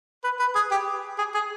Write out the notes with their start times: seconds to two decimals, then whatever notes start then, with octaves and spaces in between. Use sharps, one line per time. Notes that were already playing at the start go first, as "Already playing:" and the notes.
0.24 B4
0.40 B4
0.55 G#4
0.71 G4
1.18 G#4
1.35 G#4